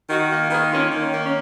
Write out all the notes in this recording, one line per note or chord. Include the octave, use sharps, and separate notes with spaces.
D#3 D#4 F#4
A#3
D#3 G#4 B4
A#3 C#4 F4
D#3
C#4
A#3
C#4